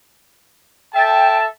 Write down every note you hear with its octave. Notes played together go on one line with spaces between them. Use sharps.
A4 E5 G5 A5